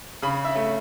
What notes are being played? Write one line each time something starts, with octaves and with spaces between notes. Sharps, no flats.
C#3 B5
E5
A3